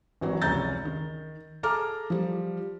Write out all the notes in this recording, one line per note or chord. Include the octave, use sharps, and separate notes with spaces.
G#1 E3 F#3
F1 C#2 C#4 A#5 G6 A6
D#3
G#4 A4 A#5 D6 F6
F3 G3